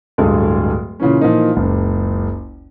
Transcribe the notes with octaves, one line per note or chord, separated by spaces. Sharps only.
D1 G2 G#3 G#4 A4
A#2 C#3 E3 C#4
A#2 E3 F3 A#3 D#4
F#1 C#2